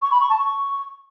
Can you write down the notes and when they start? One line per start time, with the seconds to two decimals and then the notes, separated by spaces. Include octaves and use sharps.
0.02 C#6
0.11 B5
0.20 C#6
0.30 A5
0.39 C#6